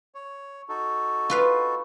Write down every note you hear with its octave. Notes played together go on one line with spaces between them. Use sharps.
C#5
D#4 F#4 A4
F4 B4 F5